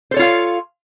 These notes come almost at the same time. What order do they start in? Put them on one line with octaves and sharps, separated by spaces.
C5 A4 C#5 F4 F5